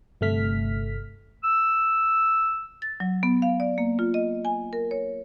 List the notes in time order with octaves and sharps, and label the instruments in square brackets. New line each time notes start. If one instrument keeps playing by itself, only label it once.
[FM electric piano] G1 C3 A3 F6 B6
[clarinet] E6
[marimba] A6
F#3
B3
F5
D5
A#3
F4
D#5
G#5
A#4
C#5